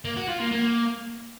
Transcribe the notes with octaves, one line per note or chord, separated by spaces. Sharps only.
A#3
F#4
F4
A#3
A#3